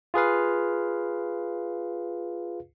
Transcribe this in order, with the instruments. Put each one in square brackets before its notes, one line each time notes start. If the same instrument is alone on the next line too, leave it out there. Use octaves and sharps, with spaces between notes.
[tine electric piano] F4 G#4 B4 F5